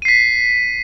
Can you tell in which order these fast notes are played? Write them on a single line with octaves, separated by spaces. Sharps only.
D#7 C7 B6